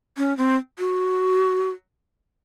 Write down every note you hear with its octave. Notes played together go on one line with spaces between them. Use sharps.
C#4
C4
F#4